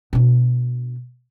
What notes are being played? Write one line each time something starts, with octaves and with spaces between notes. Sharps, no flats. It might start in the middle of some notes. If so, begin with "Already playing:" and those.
B2 D4